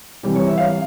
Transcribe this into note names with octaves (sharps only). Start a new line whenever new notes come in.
C3 E3 G3 G4
C#5
E5
F5